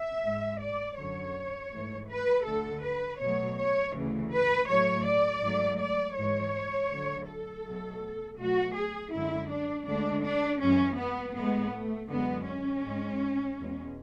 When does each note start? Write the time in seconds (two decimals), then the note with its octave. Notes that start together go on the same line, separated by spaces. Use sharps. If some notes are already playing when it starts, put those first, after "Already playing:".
Already playing: E5
0.23 G#2 G#3
0.61 D5
0.97 F#2 D3 F#3 C#5
1.72 G#2 E3 A3
2.10 B4
2.46 D2 D3 A3 A4
2.83 B4
3.20 B2 F#3 A3 C#5
3.57 C#5
3.94 D2 C#3 E3 A3
4.31 B4
4.68 A2 F#3 A3 C#5
5.05 D5
5.43 G#2 F#3 A3
5.80 D5
6.17 G#2 E3 G#3 C#5
6.91 D2 D3 F#3 A3
7.28 A4
7.65 B2 F#3 A3
8.39 B2 F#3 A3 F#4
8.76 G#4
9.13 F#2 D3 G#3 E4
9.50 D4
9.87 D2 D3 G#3 D4
10.24 D4
10.61 F#2 E3 G#3 C#4
10.98 B3
11.36 A2 G#3 B3
11.73 A3
12.10 F#2 D3 G#3 B3
12.47 C#4
12.83 G#2 G#3
13.58 E2 B2 G#3